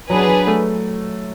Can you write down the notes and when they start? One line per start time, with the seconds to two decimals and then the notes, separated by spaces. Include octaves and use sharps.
0.10 F#3 B3 D4 G#4 B4
0.28 F#3
0.47 A3